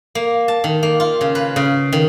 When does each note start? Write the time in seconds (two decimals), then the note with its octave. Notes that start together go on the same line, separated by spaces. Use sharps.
0.15 A#3
0.48 A5
0.64 D#3
0.83 A#3
1.00 F4
1.21 C#3
1.35 B4
1.56 C#3
1.93 D#3